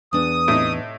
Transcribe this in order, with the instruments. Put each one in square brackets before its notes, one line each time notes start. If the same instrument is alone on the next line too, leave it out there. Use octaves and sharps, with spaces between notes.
[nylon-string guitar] E2 D4 [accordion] D#6
[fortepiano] A2 C3 D#4